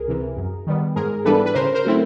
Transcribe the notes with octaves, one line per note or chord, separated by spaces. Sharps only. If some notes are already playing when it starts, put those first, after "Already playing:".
Already playing: C#2 G#4 A#4
C3 E3
F#2
D#3 G3 B3
G#2 G#4 A#4
E3 G3 B3 D4 A4 B4
B4
C#3 A#4 C5
A#4 C5
F#3 A3 C4 E4